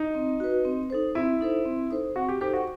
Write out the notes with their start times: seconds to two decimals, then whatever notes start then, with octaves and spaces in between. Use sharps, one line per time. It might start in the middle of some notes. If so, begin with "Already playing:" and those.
Already playing: D#4
0.15 C4
0.40 F#4 B4
0.65 C4
0.90 D#4 A4 C5
1.15 C4 E4
1.41 D#4 A4 C5
1.65 C4
1.90 D#4 A4 C5
2.16 C4 F#4
2.29 G4
2.41 D#4 G4 A4 C5
2.53 F#4